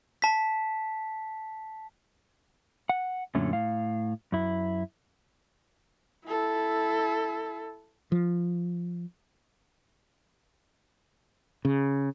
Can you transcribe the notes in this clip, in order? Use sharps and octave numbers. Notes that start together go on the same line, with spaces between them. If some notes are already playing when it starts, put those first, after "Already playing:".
A5 B6
F#5
F#2 A#2 D3 A3 C#4
A2 F5
F#2 E4
E4 A4
F3
C#3